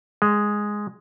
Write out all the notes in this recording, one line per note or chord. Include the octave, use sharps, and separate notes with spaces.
G#3